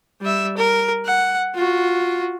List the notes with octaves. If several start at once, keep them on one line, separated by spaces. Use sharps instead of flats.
G3 E5
A#4
F#5
F4 F#4